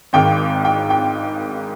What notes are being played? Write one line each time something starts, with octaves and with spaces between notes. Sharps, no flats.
G#1 G#2 D#3 G5
G5
G5